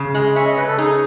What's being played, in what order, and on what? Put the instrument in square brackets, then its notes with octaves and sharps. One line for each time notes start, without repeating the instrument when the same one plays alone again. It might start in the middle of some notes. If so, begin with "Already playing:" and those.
Already playing: [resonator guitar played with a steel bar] C#3
G#3
[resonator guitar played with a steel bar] C#4 [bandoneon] E5
[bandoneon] D#5
[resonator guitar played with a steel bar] C#3 [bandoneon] B4
[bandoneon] A4
[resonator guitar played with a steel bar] D#4 [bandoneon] G#4